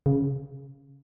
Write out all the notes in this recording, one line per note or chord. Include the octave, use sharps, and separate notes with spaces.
C#3